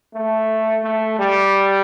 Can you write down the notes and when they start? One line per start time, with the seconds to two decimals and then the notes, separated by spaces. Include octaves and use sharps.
0.15 A3
0.84 A3
1.19 G3